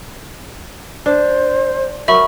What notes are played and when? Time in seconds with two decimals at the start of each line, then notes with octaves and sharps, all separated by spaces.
1.06 D4 C5
2.08 F#3 A#4 E5 B5 C#6